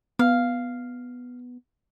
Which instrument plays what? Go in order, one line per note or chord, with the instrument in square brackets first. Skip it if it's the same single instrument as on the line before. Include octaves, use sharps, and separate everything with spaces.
[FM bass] B3 [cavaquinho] F5